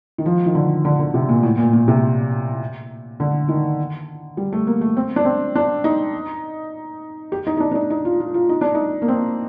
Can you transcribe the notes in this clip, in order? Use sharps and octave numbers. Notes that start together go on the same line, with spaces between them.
D#3
F3
D#3
D3
D3
D3
C3
A#2
A2
A#2
A#2
C3
D3
D#3
G3
A3
A#3
A3
C4
D4
C4
D4
D#4
G4
D#4
D#4
D4
D4
D#4
D#4
F4
F4
F4
D#4
D4
D#4
A#3
C4